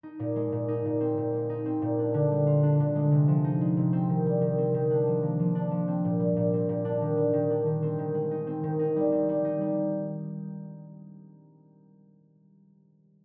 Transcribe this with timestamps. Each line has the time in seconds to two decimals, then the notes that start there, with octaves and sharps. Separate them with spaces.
0.03 D#4
0.20 A#2
0.36 G#3
0.52 A#2
0.68 D#4
0.85 A#2
1.01 C4
1.18 A#2
1.33 G#3
1.50 D#4
1.66 C4
1.82 A#2
1.99 D4
2.14 D3
2.31 G3
2.47 F4
2.63 D4
2.80 D3
2.95 G#3
3.12 C3
3.28 F3
3.44 D#4
3.61 G#3
3.77 C3
3.93 C4
4.09 D#3
4.26 G3
4.41 D#3
4.58 C4
4.74 D#3
4.91 D4
5.07 F3
5.23 A#3
5.39 F3
5.55 D4
5.71 F3
5.88 C4
6.05 A#2
6.20 G3
6.36 A#2
6.53 C4
6.69 A#2
6.85 D4
7.01 D#3
7.17 G3
7.33 D#3
7.50 D4
7.66 D#3
7.82 C4
7.99 D#3
8.14 G#3
8.31 D#4
8.47 C4
8.64 D#3
8.79 D#4
8.96 G3
9.12 C4
9.29 G3
9.45 D#4
9.61 G3